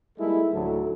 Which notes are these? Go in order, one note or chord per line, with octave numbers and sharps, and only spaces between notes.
G3 G#3 A#3 D#4 E4 A4
D2 A2 F#3 D#4 F#4 A4